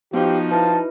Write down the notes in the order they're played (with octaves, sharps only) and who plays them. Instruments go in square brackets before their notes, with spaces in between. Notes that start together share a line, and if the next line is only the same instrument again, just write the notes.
[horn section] F3 [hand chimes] B3 [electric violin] D#4 F#4 [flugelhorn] G4
[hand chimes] E4 B4 [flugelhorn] A5